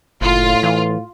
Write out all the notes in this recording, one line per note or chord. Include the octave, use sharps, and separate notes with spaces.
F#1 A2 F4
E3